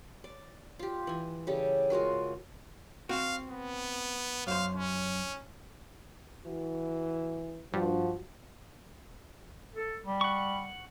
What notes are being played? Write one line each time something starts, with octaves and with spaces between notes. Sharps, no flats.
D5
F4 G4
E3 G#5
C#3 G3 G4 A4
G#3 F4 F#4 A#4
C4 F#4 F5
B3
F#2 C5 F5
C#4
E3 F#4
G2 F3 F#4
A4
G3
F#5 C#6